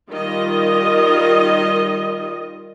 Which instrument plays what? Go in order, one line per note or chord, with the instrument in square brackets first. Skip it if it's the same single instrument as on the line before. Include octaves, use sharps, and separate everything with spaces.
[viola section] D#3 G3 F4 D#5